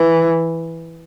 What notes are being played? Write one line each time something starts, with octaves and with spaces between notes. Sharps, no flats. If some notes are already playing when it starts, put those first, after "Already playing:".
Already playing: E3